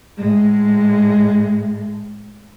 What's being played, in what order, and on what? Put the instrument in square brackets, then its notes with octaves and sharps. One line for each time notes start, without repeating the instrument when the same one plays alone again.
[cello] A2 G#3